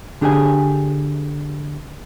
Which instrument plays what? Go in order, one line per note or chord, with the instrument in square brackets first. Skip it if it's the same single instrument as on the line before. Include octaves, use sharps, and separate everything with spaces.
[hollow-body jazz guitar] D3 D4 G4 G#4 C5 G#5